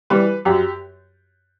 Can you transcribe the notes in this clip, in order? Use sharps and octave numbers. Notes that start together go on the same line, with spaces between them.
E3 G3 B4
F#2 G4